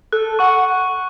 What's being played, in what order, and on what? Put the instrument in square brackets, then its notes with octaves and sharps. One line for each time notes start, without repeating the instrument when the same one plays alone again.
[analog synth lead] A4 [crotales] F#6
[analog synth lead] F#5 [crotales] C#6